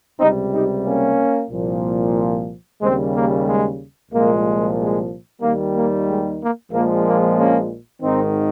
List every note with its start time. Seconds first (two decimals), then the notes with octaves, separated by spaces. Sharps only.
0.19 C#2 C3 G3 C4 D#4
0.53 D#4 G4
0.84 A#3 C#4
1.50 C2 A#2 F3
2.81 D#2 C#3 G3 G#3 C4
3.14 A#3
3.46 G#3
4.11 C2 A#2 F3 G#3 A#3
4.77 G#3
5.41 D#2 D#3 G3 A#3
5.75 A#3
6.06 G#3
6.40 A#3
6.71 A#1 A#2 F3 G#3 A#3
7.05 A#3
7.37 A#3 C#4
8.02 G#1 G#2 D#3 C4 D#4